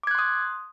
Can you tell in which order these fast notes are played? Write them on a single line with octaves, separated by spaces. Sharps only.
D6 G#6 F#6 C6 D#6